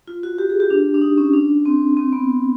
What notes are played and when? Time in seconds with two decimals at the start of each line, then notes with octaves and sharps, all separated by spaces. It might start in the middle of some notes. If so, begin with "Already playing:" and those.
0.07 F4
0.23 F#4
0.38 G4
0.50 G#4
0.60 G4
0.70 D4
0.94 D4
1.02 D#4
1.18 C#4
1.33 D4
1.66 C4
1.97 C4
2.13 B3